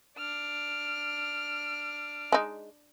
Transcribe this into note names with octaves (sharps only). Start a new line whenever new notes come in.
D4 F6
G#3 D#4